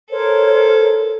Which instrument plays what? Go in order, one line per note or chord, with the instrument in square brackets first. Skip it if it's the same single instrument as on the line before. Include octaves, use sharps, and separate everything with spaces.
[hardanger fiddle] A4 [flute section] A#4 C5 C#5